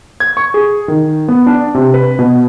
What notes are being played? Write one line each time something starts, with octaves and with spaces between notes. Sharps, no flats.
G#6
C#6
G#4
D#3
B3
D4
C3
B4
B2